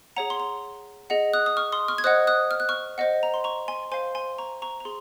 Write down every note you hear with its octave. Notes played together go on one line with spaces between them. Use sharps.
G#4 C#5 F#5 A#5
C6
A#5
G#4 D#5 F#5
D#6 F#6
D#6
C#6 F6
C6 D#6
C#6 F6
G#6
C5 D#5 F#5 D#6 F#6
D#6 F#6
F6
F#6
C#6 F6
C5 D#5 F#5
A#5
C6
A#5 C#6
G#5 C6
C5 F5 G#5 C6
G#5 C6
A#5 C#6
A#5 C#6
A#5
G#4 C6